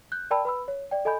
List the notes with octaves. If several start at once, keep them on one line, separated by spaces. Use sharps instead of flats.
F#6 G6
A#4 D5 G5 A5 B5 E6
B4 B5 E6
C#5
D5 G5
A4 D#5 G#5 B5 G6